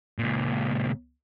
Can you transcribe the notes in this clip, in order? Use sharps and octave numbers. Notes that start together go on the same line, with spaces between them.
C#2 A#2